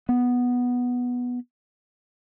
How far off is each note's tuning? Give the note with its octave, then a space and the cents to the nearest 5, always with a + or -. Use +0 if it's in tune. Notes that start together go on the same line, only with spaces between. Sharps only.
B3 -5